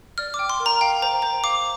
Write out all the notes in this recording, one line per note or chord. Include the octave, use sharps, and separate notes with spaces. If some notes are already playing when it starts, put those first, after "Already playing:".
D5 F6
D6
G5
C6
A#4
A#5
F5 G5
C5 A#5
C5 A#5
F5 D6